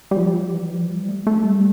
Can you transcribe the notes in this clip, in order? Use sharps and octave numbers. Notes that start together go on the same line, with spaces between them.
G3
F3
G3
F3
E3
F3
G3
A3
A3
G3